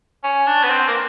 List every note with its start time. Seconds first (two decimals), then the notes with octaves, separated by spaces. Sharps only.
0.24 C#4
0.47 D4
0.64 B3
0.70 C4
0.88 A#3